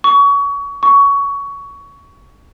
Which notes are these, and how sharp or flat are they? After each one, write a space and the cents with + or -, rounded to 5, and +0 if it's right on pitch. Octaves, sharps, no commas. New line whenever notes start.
C#6 +30
C#6 +20